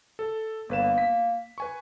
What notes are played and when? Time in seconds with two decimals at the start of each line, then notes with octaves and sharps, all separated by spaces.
0.19 A4
0.69 G1 A#3 B4 E7
0.98 B6
1.58 B4 G#5 C#6